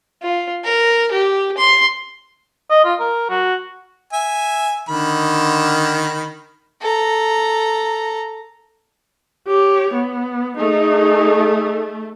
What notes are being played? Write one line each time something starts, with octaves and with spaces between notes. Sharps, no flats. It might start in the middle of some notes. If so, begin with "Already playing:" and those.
F4
A#4
G4
C6
D#5
F4
A#4
F#4
E5 G#5
D3 D#3 B5
A4 A#5
G4 C#5
B3
A3 D#4 G#4